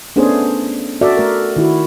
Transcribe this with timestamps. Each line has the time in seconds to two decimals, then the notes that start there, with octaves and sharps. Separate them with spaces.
0.16 A3 B3 C#4 D4 G#4 C5
1.01 F#4 A4 D5 E5
1.17 A3 A#4
1.56 D#3 E4 F#4